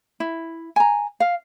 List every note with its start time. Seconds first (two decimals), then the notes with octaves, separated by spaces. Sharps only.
0.20 E4
0.76 G#5 A#5
1.20 F5